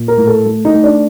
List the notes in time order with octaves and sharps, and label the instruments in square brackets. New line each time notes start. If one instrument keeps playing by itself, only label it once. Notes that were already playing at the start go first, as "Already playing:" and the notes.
Already playing: [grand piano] A#2
A#4
A2
A4
A3
D#4
A3
D4